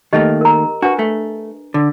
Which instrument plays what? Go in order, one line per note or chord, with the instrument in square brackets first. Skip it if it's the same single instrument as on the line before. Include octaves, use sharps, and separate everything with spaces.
[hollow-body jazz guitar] D#3 A3 A#3 [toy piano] G4 D#5
[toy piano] A#4 A#5
[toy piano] D4 B4 [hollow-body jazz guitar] F#4
[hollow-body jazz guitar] A3
D3